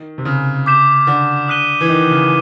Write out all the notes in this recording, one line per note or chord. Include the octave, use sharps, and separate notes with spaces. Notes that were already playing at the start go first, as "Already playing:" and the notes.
Already playing: D#3
C3
C#3
D6 G6 B6 E7
D3
D#6 F#6 B6 D#7 G7
E3
D#3
C#3